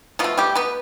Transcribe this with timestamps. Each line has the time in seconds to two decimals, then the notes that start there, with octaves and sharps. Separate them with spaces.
0.19 B2 F3 A3 F4
0.37 G3 G4
0.55 B3 B4